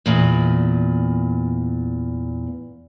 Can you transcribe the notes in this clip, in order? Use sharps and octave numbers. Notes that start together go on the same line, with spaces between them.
E2 A#2